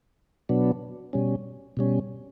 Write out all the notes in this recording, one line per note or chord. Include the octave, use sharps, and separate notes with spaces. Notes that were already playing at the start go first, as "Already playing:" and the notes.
B2 F#3 B3 D4
B2 G3 C#4
B2 G3 C#4